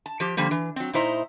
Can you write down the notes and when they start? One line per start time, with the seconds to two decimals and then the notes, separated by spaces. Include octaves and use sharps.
0.06 A5
0.20 F3 G4
0.37 D3 F3 G3 A#3
0.51 E3
0.76 F#3 C4
0.93 A#2 D#4 E4 C5 A#5